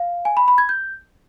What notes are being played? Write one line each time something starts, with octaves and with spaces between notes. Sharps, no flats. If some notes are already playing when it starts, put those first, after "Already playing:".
Already playing: F5
G#5
B5
B5
G#6
G6